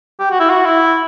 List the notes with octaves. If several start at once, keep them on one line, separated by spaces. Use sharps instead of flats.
G4
F#4
E4
F#4
E4